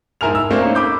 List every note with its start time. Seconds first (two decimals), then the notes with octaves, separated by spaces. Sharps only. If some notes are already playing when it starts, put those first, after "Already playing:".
0.21 G#2 E4 A#4 G#5 F6 F7
0.35 E6
0.51 A3 A#3 C4 D4 E4
0.62 A#3 C#4 D#4
0.75 B5 D6 G6